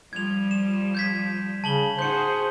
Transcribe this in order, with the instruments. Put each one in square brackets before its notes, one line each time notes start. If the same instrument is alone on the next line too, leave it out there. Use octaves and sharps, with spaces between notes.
[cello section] F3 G3 [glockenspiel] G#6 F7
[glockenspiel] E7
G6 G#6 B6
[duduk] C#3 [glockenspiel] A5 F#7 G7
[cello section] D#4 F#4 G#4 [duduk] C5 [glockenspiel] G6 C#7